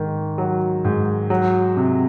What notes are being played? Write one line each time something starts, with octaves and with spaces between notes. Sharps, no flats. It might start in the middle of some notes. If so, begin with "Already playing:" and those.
Already playing: G#2 D#3
F#3
G#2
F#3
C3